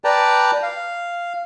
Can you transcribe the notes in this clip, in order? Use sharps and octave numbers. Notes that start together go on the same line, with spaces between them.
B4 D5 G5 A5 A#5
F5